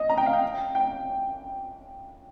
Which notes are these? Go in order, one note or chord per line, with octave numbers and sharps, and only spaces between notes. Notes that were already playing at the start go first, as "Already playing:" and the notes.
Already playing: D#5
A#5
G5
F5
G5
G5